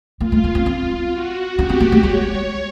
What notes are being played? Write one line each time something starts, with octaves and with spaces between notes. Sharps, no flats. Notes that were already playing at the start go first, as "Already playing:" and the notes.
A#3 F4
A3
A#3
C4
C4
F#4
C#4 G4
C4
A#3
A3
G#3 C#5